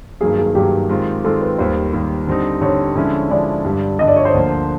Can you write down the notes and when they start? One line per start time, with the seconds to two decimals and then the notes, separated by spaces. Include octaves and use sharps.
0.21 G2 D#3 F#3 A#3 G#4
0.38 G#4
0.55 G2 D#3 F#3 A#3 G4
0.89 D#3 G#3 C4 F4
1.24 D#3 G#3 C4 F4 A4
1.41 B4
1.58 D#2 D#3 G3 C5
1.93 D#2 D#3 G3
2.27 D3 G3 C4 D#4
2.61 D3 G3 C4 D#4 C#5
2.95 D3 F3 G#3 C#4 E4
3.30 D3 F3 G#3 C#4 E4 D5
3.65 G2 D3 G3
3.99 G2 D3 G3 D#5
4.08 D5
4.16 C#5
4.25 C5
4.34 D2 D3 F3 A#3